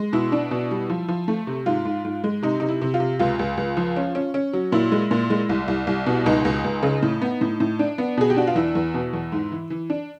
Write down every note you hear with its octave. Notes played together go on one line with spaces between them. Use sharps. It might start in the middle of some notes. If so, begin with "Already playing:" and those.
Already playing: G#3
B2 E4
D4
B2
G3
F3
F3
A3
C3
G#2 F4
G#2
G#2
G#3
C3 D#4
C3 D#4
E4
C3
F4
C3
C#2 F4
C#2
C#2
F3
C#4
C#4
C#4
F#3
A#2 E4
G#3
A#2
G#3
C2
C2
C2
B2
C#2 D#4
C#2
C#2
C#3
A2
B3
A2
A2
D4
B3
B2 G#4
G4
D4 F#4
F4
E2 E4
E2
B2
E2
G#2
E3
E3
D4